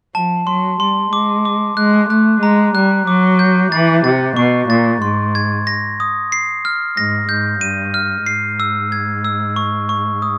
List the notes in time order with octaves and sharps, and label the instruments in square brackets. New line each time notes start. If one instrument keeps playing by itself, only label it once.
[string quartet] F3 [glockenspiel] A5
[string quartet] F#3 [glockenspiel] C6
[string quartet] G3 [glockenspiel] C6
[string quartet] G#3 [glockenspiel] D6
[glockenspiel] D6
[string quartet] G#3 [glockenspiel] F#6
[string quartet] A3 [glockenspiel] F#6
[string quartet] G#3 [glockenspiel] A#5
[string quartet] G3 [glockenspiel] F#6
[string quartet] F#3 [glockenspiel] D6
[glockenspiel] G6
[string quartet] E3 [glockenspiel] A6
[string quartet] C3 [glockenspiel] A6
[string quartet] B2 [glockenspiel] C#6
[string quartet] A#2 [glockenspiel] A6
[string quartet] G#2 [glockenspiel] C6
[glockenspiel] G#6
A#6
D#6
C7
F6
[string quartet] G#2 [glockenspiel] A#6
[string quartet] G#2 [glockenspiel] G6
[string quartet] G2 [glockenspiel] D#7
[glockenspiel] F6
[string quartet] G#2 [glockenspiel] C7
[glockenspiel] E6
G#6
E6
C#6
C#6
D#6